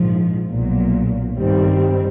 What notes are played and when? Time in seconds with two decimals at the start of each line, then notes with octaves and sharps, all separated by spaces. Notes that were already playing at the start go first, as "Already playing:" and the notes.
Already playing: A#1 G#2 F3
0.49 B1 A#2 F#3
1.35 G#1 G2 D#3 G3 C4